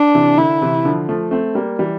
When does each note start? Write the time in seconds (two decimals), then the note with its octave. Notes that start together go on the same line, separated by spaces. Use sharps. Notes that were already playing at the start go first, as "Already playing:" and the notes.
Already playing: D4
0.15 C3 E3
0.38 D3 E4
0.62 C3 E3
0.85 D3 F3
1.09 F3 A3
1.31 A3 C4
1.55 G3 A#3
1.79 E3 G3